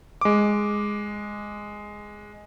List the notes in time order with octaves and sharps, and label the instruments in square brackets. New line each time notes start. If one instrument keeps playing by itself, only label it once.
[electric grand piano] G#3 D6